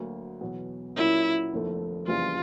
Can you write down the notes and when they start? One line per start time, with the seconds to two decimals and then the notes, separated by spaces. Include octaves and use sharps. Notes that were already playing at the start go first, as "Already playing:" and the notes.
Already playing: D2 D3 F#3 A#3
0.41 E2 B2 F#3 B3
0.96 A#2 F#3 A#3 C#4 E4
1.52 F1 D#2 D3 F3 A3
2.07 F#1 F2 C#3 E3 G3 F4